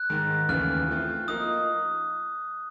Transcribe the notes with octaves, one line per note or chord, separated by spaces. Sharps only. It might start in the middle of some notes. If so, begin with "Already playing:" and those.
Already playing: F#6
G#2 D#3 G#3
D#2 C#3 E3 A3 F6
F3 A3 C4
F3 A#3 D#4 D#6